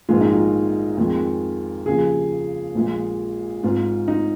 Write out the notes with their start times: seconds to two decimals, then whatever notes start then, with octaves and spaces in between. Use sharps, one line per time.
0.09 A#1 G#2 D#3 G#3 F4
0.20 D#4
0.33 F4
0.97 F2 D#3 G#3
1.86 D#2 C#3 F3 G#4
2.75 A#1 A#2 G#3
3.63 G#1 G#2 G#3 F4
4.08 D#4